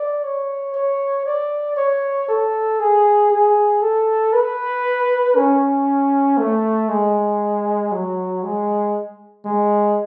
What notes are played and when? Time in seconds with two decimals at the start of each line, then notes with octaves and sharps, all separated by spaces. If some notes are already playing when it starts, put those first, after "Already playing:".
Already playing: D5
0.24 C#5
0.74 C#5
1.26 D5
1.77 C#5
2.28 A4
2.79 G#4
3.31 G#4
3.81 A4
4.33 B4
5.36 C#4
6.38 A3
6.89 G#3
7.92 F#3
8.43 G#3
9.45 G#3